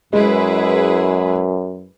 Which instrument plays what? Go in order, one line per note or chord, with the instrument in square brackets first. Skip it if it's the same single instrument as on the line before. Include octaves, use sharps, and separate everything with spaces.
[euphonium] F#2 [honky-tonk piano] G#3 [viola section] E4 G#4 B4